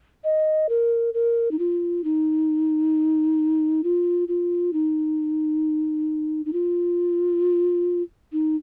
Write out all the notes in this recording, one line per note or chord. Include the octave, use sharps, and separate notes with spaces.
D#5
A#4
A#4
D#4
F4
D#4
F4
F4
D#4
D#4
F4
D#4